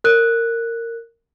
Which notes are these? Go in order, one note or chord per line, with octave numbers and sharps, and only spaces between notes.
A#4 F#6